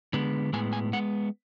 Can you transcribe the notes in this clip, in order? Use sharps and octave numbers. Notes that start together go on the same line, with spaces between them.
D3 G#3 B3
A2 G#3 B3 G#5
G#5
G#3 B3 F#5